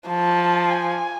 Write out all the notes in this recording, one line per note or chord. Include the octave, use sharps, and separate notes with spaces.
F3 A5
G#5